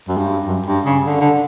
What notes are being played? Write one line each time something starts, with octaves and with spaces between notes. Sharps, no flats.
F#2
G2
F#2
G2
C#3
D3
D3